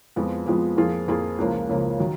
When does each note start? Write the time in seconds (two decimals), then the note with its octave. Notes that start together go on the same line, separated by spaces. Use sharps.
0.16 F2 F3 G#3 B3
0.46 F2 F3 G#3 B3
0.77 F2 F3 A#3 F4 G#4
1.08 F2 F3 A#3 F4 G#4
1.38 C#2 C#3 F3 A#3
1.69 C#2 C#3 F3 A#3
2.00 D#3 F#3